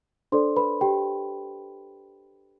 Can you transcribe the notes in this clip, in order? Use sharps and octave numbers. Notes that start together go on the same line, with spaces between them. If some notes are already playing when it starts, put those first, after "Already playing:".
D4 A4 C5 D5 C6
B4 B5
G4 G5